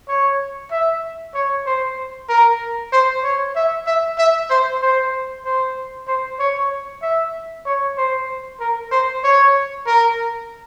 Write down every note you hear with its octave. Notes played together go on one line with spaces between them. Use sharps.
C#5
E5
C#5
C5
A#4
C5
C#5
E5
E5
E5
C5
C5
C5
C5
C#5
E5
C#5
C5
A#4
C5
C#5
A#4